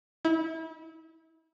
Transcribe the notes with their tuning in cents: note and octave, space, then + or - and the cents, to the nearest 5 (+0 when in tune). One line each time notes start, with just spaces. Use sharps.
E4 -30